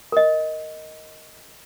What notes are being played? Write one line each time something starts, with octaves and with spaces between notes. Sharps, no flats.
A#4 D#5